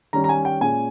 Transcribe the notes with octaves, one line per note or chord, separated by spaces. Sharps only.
D#3 G3 C#4 A#5
A#5
G#5
G5
A#2 G#3 C#4 G#5